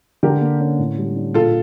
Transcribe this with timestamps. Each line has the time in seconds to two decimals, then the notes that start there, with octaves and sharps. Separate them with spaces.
0.23 D3 G4 A#4
0.41 A#3
0.60 C#4
0.78 A2
0.98 G3
1.16 D4
1.34 A#2 F4 A4